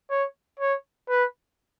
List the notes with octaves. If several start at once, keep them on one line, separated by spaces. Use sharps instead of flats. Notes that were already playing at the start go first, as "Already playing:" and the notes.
C#5
C#5
B4